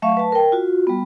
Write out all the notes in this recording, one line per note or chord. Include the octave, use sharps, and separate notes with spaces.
F#3 A3 E5 F5 C#6
B4 A5
A#4 G5
F4 F#4
G3 B3